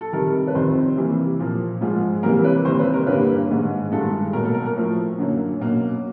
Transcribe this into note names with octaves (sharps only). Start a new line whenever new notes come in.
A4
C3 D#3 G3 A#4
B4
F2 C3 D#3 C5
C3 E3 G3 A#3
A#2 F3 A#3
G#2 F3 G#3
C3 E3 G3 A#3 A#4
B4
C3 D#3 G3 A#3 C5
B4
A#4
G2 D3 G3 A#3 B4
G#2 D#3 G#3
G2 D#3 G#3 A4
B2 F#3 A#3 A#4
A4
A#4
A#4
A2 F3 A3
F#2 D3 F#3 A#3
B2 F#3 A#3